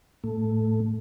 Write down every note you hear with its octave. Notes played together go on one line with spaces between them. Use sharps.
A2 A3